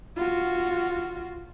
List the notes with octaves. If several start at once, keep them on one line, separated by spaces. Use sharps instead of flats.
F4 F#4